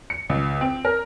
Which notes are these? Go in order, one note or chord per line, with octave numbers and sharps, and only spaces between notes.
C#7
C#2
C4
A#4